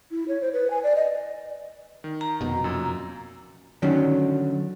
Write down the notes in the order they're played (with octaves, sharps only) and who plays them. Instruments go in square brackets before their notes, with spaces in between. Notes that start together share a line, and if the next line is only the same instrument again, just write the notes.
[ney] E4
C#5
C5
B4
G#5
D5
D#5
[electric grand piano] D#3
[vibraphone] A#5
[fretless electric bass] F1 B2
[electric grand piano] F#2 A#2 E6
[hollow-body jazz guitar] D3 D#3 F#3 C#4